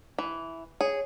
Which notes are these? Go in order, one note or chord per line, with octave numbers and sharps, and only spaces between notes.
E3
G#4 C#5